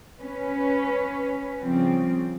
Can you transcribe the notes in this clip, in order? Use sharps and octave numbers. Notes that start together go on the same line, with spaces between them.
C#4 B4
C#3 F3 G3 C4